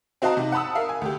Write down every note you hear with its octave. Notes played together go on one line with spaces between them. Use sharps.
C4 F#4 D#5 F5 A5 A#5
C3 D#4
F#5 A5 B5 D#6 E6
A#4 E5 F5
G#5
D2 G4